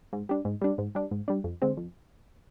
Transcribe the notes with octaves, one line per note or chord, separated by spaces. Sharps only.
G#2
G3 D4
G#2
G3 D4
G#2
G3 D4
G#2
G3 D4
F2
D3 G#3 C4
F2